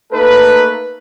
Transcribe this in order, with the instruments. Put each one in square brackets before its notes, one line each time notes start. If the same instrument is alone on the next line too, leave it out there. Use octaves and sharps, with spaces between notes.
[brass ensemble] A3 A#3 D#4 A4 B4